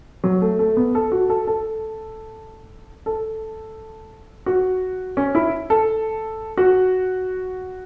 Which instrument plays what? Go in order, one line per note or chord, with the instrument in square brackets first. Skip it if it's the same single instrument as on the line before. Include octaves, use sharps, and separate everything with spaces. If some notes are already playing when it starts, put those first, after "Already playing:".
[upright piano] F#3
A3
A3
B3
A4
F#4
A4
A4
A4
F#4
C#4
E4
A4
F#4